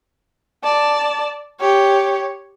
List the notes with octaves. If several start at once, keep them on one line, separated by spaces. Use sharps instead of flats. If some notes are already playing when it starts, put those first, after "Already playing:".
D5 A5
G4 C#5